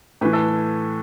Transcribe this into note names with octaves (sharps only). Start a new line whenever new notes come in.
A2 E3 B4
A4